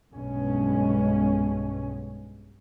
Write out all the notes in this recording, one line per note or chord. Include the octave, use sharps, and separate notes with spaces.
B1 G2 B2 G#3 C#4